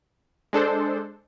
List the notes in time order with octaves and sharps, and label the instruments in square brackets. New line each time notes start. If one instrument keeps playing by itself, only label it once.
[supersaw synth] G#3 D4 A4 C5